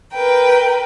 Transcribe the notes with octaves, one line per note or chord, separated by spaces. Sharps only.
A#4 B4 G5